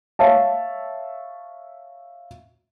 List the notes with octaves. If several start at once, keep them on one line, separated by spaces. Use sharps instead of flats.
C#5 E5 F5 A5